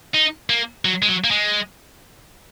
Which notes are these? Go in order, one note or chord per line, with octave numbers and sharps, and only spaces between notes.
D#4
A#3
F#3
G#3
F#3
A#3
G#3